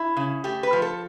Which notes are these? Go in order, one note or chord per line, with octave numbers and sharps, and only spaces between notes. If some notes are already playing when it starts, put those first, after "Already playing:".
Already playing: E4
C#3
A3 G4
B4
F3
A4